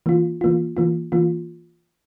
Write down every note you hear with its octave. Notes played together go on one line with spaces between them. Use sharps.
E3 A#3 F4
E3 A#3 F4
E3 A#3 F4
E3 A#3 F4